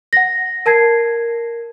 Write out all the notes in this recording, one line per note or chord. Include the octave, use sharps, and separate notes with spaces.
F#5 A#6
A#4 A5 G#6 C7